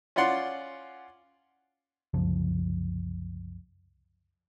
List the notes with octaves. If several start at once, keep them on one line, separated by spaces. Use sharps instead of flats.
C#4 F4 D5 F#5 C6
C2 F#2 C#3 F3